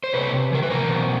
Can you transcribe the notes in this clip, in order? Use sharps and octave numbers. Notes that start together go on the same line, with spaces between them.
C5
C3 B4 C#5
E3 A#4
B4
A#4 C5
B2